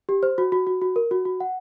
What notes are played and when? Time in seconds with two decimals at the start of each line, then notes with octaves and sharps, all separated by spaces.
0.09 G4
0.23 C5
0.38 F#4
0.52 F#4
0.67 F#4
0.82 F#4
0.96 A#4
1.11 F#4
1.25 F#4
1.40 F#5